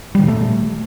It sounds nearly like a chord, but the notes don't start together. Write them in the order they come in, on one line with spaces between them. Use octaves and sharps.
G3 D#3 A#2 A3